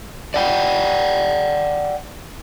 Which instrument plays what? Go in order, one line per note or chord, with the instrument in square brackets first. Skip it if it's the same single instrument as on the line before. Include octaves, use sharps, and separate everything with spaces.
[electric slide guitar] D5 F#5 G5